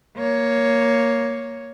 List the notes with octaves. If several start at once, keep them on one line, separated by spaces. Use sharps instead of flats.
A#3 C#5